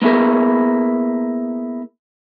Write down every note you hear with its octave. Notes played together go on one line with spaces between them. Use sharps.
A#3 B3 E4 G#4 A#4